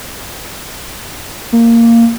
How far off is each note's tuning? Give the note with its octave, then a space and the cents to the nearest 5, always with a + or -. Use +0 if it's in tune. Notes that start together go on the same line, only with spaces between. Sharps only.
A#3 -10